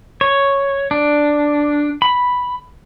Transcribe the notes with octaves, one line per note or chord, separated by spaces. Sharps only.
C#5
D4
B5